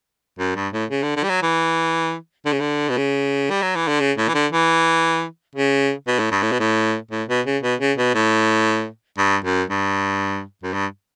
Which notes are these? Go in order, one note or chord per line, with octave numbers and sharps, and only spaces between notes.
F#2
G2
A2
C#3
D3
D3
G3
F#3
E3
D3
C#3
D3
B2
C#3
G3
F#3
E3
D3
C#3
A2
E3
D3
E3
C#3
B2
A2
G2
A2
B2
A2
A2
B2
C#3
B2
C#3
B2
A2
G2
F#2
G2
F#2
G2